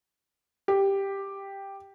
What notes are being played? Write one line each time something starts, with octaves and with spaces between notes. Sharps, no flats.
G4